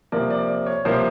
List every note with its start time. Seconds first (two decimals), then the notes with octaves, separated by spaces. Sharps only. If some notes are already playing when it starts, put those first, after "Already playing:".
0.12 C3 F3 A#3 D5
0.30 D5
0.49 D5
0.66 C#5
0.85 C3 F3 A#3 C5